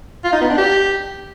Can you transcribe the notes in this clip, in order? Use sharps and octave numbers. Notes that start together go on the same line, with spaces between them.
F4
D#4
B3
D4
G4